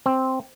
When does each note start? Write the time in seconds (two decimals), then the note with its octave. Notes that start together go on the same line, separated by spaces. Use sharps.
0.06 C4